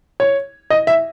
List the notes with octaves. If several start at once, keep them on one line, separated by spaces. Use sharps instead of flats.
C#5
D#5
E5